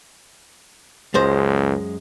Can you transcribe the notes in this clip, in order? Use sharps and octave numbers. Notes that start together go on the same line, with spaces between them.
C#2 F#2 G#3 C5